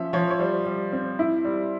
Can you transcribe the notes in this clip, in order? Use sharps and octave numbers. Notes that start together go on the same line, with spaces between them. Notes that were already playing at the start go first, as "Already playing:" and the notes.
Already playing: F3 C#4 E5
F3 C#5
C#5
G3 C5
G3
C4
E4
G3